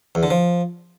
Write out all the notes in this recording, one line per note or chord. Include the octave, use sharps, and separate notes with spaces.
E2
D3
F3